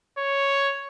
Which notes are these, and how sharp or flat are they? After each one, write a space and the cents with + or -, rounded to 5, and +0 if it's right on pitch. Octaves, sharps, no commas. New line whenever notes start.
C#5 +0